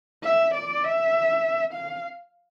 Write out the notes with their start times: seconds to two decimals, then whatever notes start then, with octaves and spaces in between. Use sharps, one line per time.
0.24 E5
0.55 D5
0.84 E5
1.74 F5